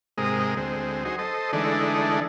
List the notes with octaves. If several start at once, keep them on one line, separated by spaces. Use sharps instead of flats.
G#2 C3 G#3 A#4 D#5
D2 G#3 C4
F#3 D#4 G#4 C5
A4 C5 D#5
D3 E3 G#3 A3 D4 D#4